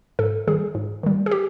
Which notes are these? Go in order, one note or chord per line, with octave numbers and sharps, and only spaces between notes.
G#2 A4
D#3 G3 G#4
G#2
D#3 G3
G#4
G4